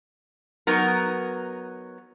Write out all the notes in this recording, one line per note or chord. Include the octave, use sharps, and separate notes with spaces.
F#3 B3 D#4 A#4